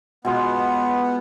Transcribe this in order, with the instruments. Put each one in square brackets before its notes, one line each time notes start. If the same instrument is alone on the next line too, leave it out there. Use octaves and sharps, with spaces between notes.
[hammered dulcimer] B2 G#3 F4 [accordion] B3